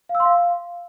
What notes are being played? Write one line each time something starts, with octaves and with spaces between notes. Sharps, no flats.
F5
E6
C6
F5